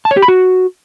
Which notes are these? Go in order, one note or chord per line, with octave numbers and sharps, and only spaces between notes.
A5
C#5
G4
B5
F#4